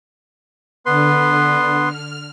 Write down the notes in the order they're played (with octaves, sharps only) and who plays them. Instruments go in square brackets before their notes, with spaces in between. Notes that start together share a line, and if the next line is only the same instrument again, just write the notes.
[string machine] D3 [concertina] B3 B4 C6
[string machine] F6